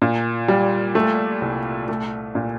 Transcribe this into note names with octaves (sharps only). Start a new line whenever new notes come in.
A#2
G3
A3
C2
A3
A#2